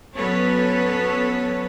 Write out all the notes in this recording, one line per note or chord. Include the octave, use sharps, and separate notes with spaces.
F#3 B3 C#4 A4 B4 C#5